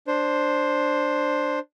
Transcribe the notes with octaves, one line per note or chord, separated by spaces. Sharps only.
D4 C5